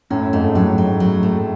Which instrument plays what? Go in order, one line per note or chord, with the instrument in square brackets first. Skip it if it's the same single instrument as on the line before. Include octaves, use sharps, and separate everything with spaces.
[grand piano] F#2 A2 [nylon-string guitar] C#4
[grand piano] F2 G#2 [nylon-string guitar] A3
[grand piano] G#2
[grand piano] F#2 A2 [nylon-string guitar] F#3
[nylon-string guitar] F#3
F#3
A3